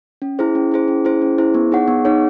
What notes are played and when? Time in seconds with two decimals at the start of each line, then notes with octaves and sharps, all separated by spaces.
0.22 C#4
0.39 E4 G#4 C5
0.55 C#4
0.72 E4 G#4 C5
0.88 C#4
1.05 E4 G#4 C5
1.22 C#4
1.38 E4 G#4 C5
1.55 B3
1.72 D#4 G#4 C#5 F#5
1.88 B3
2.05 D#4 G#4 C#5 F#5